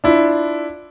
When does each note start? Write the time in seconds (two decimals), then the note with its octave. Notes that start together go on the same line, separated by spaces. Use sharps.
0.04 D4 E4 F4